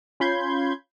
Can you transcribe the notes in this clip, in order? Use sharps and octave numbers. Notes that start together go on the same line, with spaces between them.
C#4 F4 B5 C6 G6 G#6